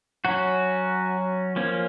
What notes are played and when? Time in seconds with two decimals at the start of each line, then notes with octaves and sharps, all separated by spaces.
0.25 F#3 C#4 F#4
1.56 F3 A#3 C#4